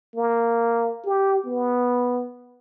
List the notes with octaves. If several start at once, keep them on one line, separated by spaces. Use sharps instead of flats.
A#3
G4
B3